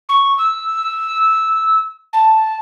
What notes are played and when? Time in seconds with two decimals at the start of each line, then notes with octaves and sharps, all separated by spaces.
0.09 C#6
0.38 E6
2.13 A5